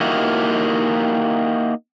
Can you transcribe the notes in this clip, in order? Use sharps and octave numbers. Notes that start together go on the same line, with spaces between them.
A#3 D#4 E4 F#4 G4